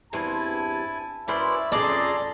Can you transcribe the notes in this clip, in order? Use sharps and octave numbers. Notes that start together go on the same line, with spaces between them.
E2 G2 C4 E4 G#5 A5
F#2 C#4 E4 B4 C5 D5 E5
F2 C#3 G#4 A4 D5 A#5 C6